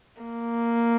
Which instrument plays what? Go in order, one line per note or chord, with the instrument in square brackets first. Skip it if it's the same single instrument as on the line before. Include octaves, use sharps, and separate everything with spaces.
[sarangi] A#3